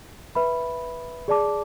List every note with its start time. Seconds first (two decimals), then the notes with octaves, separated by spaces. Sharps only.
0.35 B4 E5 B5
1.28 G#4 D5 A5 D6